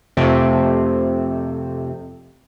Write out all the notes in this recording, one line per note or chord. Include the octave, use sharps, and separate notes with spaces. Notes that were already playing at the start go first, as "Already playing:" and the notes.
F2 C3 A3 C4